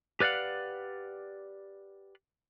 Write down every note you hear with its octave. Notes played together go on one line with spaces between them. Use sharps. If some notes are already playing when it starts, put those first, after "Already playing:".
G4 B4 D5 F5 F#5